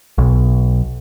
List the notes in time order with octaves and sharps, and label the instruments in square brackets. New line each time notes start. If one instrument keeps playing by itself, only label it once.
[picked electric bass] B1